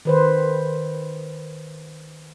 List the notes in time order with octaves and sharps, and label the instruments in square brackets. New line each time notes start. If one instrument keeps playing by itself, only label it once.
[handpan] D#3 B4 C5